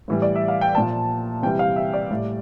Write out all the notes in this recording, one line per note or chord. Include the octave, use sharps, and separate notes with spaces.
A2 E3 G3
D5
E5
F5
G5
A#2 F3 A5
C3 E3 G3 G5
F5
E5
D5
A2 G3